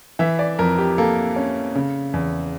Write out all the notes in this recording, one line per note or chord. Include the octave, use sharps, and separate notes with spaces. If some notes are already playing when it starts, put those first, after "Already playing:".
E3 E5
D5
F2 A#4
G4
A#3 A4
C#4
C#3
E2